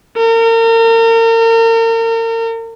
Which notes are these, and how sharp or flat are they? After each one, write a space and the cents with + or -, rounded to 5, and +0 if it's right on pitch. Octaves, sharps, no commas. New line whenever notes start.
A#4 -35